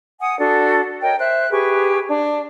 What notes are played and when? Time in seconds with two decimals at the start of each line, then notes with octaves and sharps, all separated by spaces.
0.20 F#5 G#5 D#6
0.39 D4 F#4 A4
1.02 A#4 C#5 D#5 G5
1.19 C5 E5 F#6
1.51 G4 G#4 B4 C#6
2.08 D4